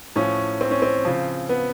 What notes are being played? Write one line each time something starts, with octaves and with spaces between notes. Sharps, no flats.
A2 F3 C#4
C4
C#4
C4
C#3 F3
B3